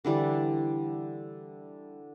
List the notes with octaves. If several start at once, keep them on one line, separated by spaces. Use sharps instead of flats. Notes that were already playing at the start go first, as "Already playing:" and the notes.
D3 E3 G3 D5